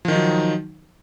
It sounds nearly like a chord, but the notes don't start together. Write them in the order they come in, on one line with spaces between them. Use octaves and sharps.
F3 D#3 D#4 F#3